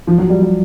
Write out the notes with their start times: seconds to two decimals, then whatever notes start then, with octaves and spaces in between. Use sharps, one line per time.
0.07 F3
0.18 F#3
0.30 G3
0.41 G3